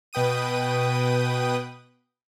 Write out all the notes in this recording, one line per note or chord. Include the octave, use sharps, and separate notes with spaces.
B2 B4 G5 D#6 D#7